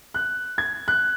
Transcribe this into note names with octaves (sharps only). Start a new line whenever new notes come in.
F#6
G#6
F#6